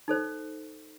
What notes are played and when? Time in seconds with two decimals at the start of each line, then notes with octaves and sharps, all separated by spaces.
0.08 D#4 A4 C5